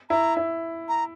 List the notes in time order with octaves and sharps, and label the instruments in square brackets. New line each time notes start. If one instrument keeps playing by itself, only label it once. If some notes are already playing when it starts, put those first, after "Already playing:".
[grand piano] E4 [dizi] A#5
[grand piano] E4
[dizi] A#5